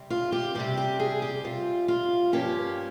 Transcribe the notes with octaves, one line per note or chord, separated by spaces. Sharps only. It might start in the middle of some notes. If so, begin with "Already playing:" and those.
Already playing: C3 G3 C4
F4
G4
C3 G3 C4 G4
G4
G#4
G4
C3 G3 C4 F4
F4
G2 F3 A#3 C#4 G4